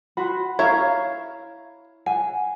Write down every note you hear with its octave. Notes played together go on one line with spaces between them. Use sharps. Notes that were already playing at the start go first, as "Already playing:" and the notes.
F#4 B5 C6
E4 C#5 E5 F5 A#5 G#6
F#5 G#5